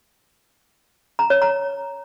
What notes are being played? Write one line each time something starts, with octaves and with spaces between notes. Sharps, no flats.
A#5
C#5
A#5